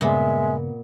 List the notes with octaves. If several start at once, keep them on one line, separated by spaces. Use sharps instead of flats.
G2 A#2 C#3 G#3 B3 E5